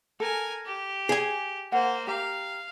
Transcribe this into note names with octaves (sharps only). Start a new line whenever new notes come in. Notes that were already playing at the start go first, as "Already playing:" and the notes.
A4 A#4 G#5
G4
G#4 G#5
A#3 C5 F#5
G4 F5 A#5